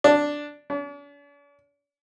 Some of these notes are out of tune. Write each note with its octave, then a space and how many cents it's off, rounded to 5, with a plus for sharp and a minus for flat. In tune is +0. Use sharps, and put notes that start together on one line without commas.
D4 +0
D4 -45